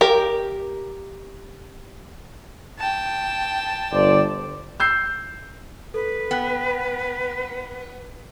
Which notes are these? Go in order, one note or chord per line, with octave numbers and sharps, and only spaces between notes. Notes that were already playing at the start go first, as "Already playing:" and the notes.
G4 A#4
G5 A5
G1 C5 D5
E6 G6 C7
A4 B4
B3 G5 F#6